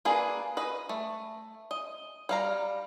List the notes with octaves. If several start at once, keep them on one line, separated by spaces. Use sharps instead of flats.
A#3 D4 G#4 B4
B4 D#5
A3
D#5
G3 F5 A#5